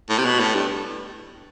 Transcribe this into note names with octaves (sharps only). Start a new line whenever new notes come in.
A2
C3
B2
A2
G2